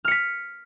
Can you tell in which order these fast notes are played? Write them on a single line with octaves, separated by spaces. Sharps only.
F6 C#7 B6